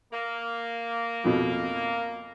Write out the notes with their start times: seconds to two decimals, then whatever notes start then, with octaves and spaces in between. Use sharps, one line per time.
0.13 A#3
1.24 F2 B2